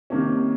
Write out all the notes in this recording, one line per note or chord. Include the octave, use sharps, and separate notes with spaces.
C3 D#3 A#3 C#4